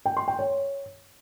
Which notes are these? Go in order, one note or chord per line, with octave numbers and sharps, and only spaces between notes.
G5
C6
G5
C#5